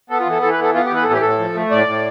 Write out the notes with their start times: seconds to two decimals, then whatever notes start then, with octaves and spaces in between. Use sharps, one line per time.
0.10 B3 A4
0.20 F4
0.26 E3
0.31 A4
0.41 E3 A4
0.52 B4
0.59 B3 A4
0.74 B3 F4
0.85 G4
0.90 E3 B4
1.04 A2 A4
1.13 G4
1.21 A2 A4
1.39 F3
1.55 A3
1.71 A2 D5
1.87 A2